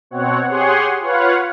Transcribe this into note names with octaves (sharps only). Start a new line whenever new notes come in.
B2 C4 C#5 F#5
G4 G#4 C#5 F#5 G#5 C6
F4 B4 C#5 F5 F#5